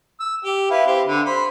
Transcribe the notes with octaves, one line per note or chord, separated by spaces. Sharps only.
E6
G4
E4 B4 F5
C4 G4
D3
C5 B5